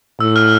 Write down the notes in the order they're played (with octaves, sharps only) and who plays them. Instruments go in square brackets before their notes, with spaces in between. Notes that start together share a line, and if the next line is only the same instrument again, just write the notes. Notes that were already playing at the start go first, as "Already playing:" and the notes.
[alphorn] A2 [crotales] E6
[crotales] F6